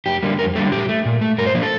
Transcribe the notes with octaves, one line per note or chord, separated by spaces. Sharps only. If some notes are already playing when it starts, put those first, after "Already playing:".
F2 G4
D3 G3 A#3
F2 A#4
D3 G3 A#3 A4
A#2 G4
A3
A#2
A3
G2 A#4
C5
F3 A#3
A4